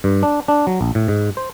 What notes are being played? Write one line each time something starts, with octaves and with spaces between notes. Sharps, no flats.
G2
D4
D4
F#3
A#1
A2
G#2
C5